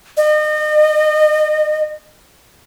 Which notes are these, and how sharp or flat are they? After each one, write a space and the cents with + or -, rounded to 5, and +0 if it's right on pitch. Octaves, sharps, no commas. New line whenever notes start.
D#5 -35